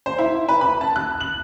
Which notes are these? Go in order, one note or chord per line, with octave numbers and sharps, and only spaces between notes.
C5
E4
B4
B5
A5
F#6
F#7